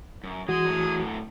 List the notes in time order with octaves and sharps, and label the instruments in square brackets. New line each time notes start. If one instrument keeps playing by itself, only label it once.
[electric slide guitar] F#2
[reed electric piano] E3 F#4 [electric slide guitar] G#3 [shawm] G#4
[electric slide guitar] A2 F#3